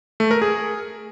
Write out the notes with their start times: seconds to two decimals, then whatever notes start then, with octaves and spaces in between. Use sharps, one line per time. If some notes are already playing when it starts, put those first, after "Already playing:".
0.20 A3
0.31 A#4
0.42 G#4